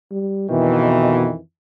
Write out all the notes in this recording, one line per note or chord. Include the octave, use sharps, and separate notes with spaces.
G3
F2 B2 D#3 E3